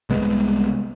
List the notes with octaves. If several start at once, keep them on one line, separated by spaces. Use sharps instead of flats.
C2 G#3 B3